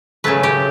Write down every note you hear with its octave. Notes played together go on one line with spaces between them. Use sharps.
C#3 F#3 A3 B4
G4